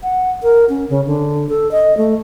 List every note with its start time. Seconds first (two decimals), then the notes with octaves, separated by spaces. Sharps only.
0.03 F#5
0.43 A#4
0.69 C#4
0.90 C#3
1.07 D3
1.49 A4
1.71 D#5
1.97 A3